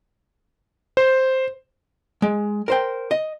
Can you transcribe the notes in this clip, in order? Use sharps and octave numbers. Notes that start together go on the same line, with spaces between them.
C5
G#3
A#4 C5 G5
D#5